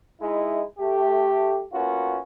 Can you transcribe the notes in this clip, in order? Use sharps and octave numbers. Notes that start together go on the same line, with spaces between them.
G#3 D#4 E4
A3 G4
A#3 B3 C#4 F4 F#4